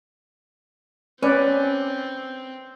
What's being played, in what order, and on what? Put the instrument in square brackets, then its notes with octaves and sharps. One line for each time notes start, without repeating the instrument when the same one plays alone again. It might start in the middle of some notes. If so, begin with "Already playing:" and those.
[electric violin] C4 [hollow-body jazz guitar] C#4 [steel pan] B4 D5